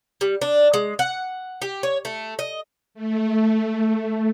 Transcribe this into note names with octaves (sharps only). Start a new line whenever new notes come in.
G3
D4
G#3
F#5
G4
C#5
A3
D#5
A3